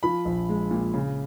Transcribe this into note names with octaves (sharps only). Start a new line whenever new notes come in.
F3 B5
A#1
G#3
A#2
C#3